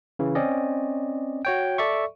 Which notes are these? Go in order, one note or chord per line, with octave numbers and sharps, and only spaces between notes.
C#3 E3
C4 C#4 D5 D#5
F#4 C#5 G5
A4 D5 E5 C#6